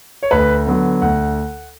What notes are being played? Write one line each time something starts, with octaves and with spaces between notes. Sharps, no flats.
C#5
D2 B4
D3 F#3 B3
D2 F#5